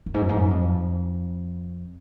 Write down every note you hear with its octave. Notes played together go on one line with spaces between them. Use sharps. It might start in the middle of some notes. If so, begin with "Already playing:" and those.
F#2
G#2
F#2
G#2
F#2
F2